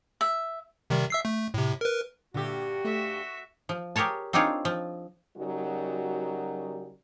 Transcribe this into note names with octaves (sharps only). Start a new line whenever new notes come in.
E5
C3 D#3 G3
E5 E6 C7
A3
A2 C3
A#4 B4
G2 A#2 D3 F#4 G4 E5
A3 E5
F3
G4 G#4 A#4 C#5 A5
C4 D4 D#4 F4 G#4 C#5
F3
C#3 F#3 G3 D#4 F#4 A#4